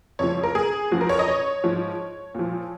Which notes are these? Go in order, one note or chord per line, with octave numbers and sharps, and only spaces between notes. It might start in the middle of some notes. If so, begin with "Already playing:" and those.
F2 C#3 F3 C#5
A#4
G#4
F#2 F3 F#4
A#4
C#5
D#5
C#5
G#2 F3
A#2 F3